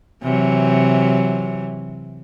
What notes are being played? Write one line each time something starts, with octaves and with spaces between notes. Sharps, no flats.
C3 E3 F#3